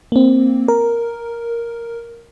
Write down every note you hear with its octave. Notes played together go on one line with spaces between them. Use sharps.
A#3 C4
A#4